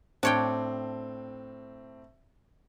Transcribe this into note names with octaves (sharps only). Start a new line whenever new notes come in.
A2 C4 D4 C#5 G5